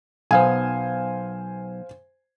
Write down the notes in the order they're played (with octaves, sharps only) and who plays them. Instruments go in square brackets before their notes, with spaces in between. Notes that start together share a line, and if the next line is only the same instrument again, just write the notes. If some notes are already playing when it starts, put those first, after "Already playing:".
[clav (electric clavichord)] B1 B3 [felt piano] C5 F5 G#5